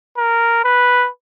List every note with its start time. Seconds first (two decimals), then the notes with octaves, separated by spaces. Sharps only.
0.18 A#4
0.64 B4